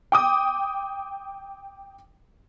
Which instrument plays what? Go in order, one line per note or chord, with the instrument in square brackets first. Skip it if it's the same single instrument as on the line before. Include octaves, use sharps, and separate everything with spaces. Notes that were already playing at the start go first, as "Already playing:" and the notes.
[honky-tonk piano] G5 D6 D#6